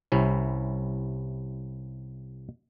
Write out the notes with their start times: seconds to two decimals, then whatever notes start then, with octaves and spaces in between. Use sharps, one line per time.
0.12 C2 C3 C#4 E4